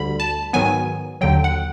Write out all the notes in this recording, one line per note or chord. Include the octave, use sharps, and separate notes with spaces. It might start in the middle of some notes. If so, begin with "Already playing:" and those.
Already playing: D2 D3 G3 B5
A5
G#2 D#3 F#3 B3 G#5
D#2 D3 F#3 G5
F#5